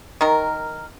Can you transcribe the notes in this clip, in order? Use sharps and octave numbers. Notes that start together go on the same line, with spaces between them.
D#3 A#4